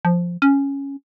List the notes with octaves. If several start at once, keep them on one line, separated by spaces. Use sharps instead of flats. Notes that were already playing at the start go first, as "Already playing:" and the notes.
F3
C#4